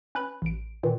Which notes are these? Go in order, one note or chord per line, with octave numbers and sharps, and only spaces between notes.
C#4 B4 B5
A1 D7
A#2 D#3 E3